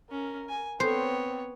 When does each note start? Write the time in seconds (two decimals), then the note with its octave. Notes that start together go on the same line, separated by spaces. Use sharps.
0.11 C#4 A#4
0.49 G#5
0.80 B3 C4 C5 C#5